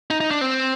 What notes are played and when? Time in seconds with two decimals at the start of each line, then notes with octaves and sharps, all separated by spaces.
0.11 D#4
0.21 D#4
0.31 D4
0.41 C4